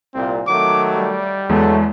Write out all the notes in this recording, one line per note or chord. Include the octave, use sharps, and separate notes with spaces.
C2 A#2 C4
D#3 F#3 A3 D6
G3
E2 F#3 G#3 A3